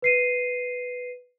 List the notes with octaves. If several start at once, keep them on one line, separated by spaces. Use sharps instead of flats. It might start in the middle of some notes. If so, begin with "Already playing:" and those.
B4 C7 D#7